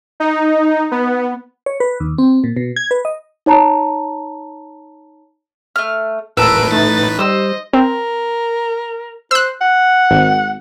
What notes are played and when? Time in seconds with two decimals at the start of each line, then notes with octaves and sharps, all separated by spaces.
0.20 D#4
0.91 B3
1.66 C#5
1.80 B4
2.00 D#2
2.18 C4
2.44 A#2
2.56 B2
2.76 G#6
2.91 B4
3.05 D#5
3.46 D#4 C#5 A5 A#5
5.76 A3 F6
6.37 D#1 A1 A2 A#4 B4 A5 E6 D7
6.72 A3 D#4 A6
7.19 G3 C5 D#5 E6
7.73 C4 A#4
9.31 C5 E6 F#6
9.61 F#5
10.11 G#1